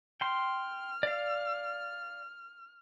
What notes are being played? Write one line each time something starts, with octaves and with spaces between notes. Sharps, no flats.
G5 C6 F6
D5 F5